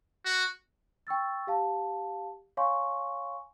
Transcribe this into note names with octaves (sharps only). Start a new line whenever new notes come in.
F#4
G5 C#6 E6 A6
G4 F5 A5
C#5 F5 G#5 C6 C#6